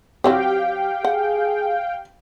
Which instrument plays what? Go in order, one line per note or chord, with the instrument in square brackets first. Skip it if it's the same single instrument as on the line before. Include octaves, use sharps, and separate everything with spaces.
[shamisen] F#3 C4 C#5 [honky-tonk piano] G4 [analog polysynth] F5 G5
[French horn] G#4 [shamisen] F#5